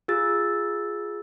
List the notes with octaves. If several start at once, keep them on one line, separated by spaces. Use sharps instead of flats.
F4 G#4 E6 A6